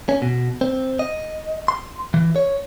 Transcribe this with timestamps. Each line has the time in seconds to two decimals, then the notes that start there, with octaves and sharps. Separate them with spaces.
0.09 C#4
0.22 B2
0.61 C4
0.99 D#5
1.68 C6
2.14 E3
2.36 C#5